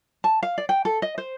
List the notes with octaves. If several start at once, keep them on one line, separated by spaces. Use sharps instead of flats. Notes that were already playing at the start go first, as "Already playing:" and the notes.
A5
F5
D5
G5
A4
D#5
C5